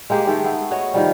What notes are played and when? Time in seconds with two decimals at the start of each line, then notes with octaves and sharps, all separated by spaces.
0.10 G#3 A#3 G4 G#4
0.27 D#3 G#3 A3
0.44 A3 B3 G#4
0.71 F#4 C#5 D#5
0.94 D#3 F3 G3